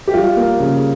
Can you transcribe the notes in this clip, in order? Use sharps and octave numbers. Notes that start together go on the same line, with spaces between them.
G4
G3 F4
A#3
C#3